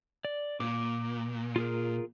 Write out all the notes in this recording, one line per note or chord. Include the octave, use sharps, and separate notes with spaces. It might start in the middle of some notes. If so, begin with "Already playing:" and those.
D5
A#2 D6
F4 G#4 A#4